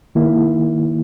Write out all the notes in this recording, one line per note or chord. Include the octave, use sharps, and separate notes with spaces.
D#3 A#3 E4